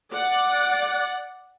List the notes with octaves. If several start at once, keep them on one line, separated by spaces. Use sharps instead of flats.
D5 F#5